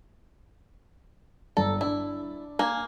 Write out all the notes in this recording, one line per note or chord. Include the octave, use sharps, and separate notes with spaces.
G1 A4 D5 A#5
D4 E4 D5
A#3 G#5